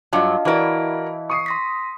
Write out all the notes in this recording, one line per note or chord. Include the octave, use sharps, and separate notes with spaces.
G2 F#3 F4 D#5 F5 A5
E3 E4 F#4 A#4 D5
C#6 D#6 C7
C6 A#6 B6